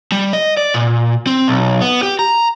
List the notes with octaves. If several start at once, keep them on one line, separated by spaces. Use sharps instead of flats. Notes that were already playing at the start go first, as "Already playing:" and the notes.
G3
D#5
D5
A#2
C4
B1
B3
G4
A#5